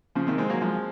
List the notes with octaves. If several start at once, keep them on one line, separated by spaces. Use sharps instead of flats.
C#3 F3
C3 D#3
G#3 C4
F#3 A#3
F3 G#3